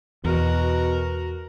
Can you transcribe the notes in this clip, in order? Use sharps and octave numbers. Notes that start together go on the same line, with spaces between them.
E2 B2 F#4 A#4